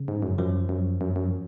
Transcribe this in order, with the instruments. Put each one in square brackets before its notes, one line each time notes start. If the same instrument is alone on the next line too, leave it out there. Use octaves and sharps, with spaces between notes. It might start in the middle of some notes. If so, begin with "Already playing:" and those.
Already playing: [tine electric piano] C#3
[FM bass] G#2
F#2
[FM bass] F#2 [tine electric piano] F3
[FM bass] F#2
F#2
F#2